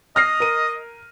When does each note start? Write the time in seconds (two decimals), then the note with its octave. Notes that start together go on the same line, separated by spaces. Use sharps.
0.16 D#5 F6 A#6 C7
0.40 A#4 D#7